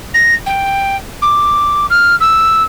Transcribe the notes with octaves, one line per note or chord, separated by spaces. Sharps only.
A#6
G5
D6
F6
E6